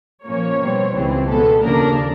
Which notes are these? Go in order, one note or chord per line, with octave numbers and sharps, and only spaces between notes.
A#2 F3 A#3 C#4 C#5
B2 G3 C4
C#2 C#3 E3 G3 C4
B2 G#3 B3 A4
D#2 C#3 F3 A#3 D4 A#4